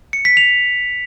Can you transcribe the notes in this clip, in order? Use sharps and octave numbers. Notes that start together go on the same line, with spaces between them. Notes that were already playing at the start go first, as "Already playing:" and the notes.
C#7
B6
F7